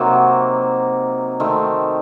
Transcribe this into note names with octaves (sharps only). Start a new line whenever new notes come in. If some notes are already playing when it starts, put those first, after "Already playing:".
Already playing: C3 F#3 A#3 D#4
D#3 A3 C4